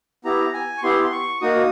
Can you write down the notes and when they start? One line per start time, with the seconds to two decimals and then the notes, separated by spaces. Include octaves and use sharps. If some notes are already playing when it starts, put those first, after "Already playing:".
0.25 B3 E4 G4 A#5
0.54 G#5
0.77 C#6
0.83 B3 E4 G4 C6
1.04 C6
1.12 C#6
1.41 A#3 D#4 F#4 D#6